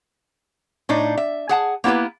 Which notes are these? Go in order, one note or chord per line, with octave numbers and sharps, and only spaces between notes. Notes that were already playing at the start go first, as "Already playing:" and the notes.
A2 D4 D#4
E5
G#4 F#5 A5
A#3 B3 E4 G4 B4